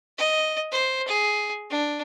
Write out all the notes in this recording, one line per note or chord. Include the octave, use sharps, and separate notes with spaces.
D#5
C5
G#4
D4